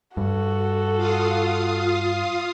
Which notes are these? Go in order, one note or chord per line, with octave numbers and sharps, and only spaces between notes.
G2 F#4 A4
F4 F5 D#6